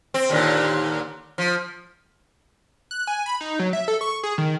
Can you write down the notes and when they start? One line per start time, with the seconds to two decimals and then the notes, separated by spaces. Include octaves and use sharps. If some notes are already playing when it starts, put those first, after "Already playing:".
0.14 C4
0.30 D#2 A#2 D3
1.38 F3
2.91 F#6
3.07 G#5
3.26 B5
3.41 D#4
3.59 F#3
3.73 E5
3.88 A4
4.01 C#6
4.24 G#4
4.38 D#3